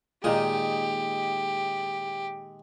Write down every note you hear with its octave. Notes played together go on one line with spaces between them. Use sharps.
A#2 D#3 G#3 D#4 G4 D#6